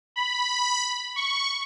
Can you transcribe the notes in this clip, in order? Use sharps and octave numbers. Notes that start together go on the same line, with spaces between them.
B5
C#6